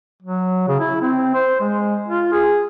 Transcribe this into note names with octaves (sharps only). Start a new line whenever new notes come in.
F#3
C#3
E4
C4
C5
G#3
F4
G#4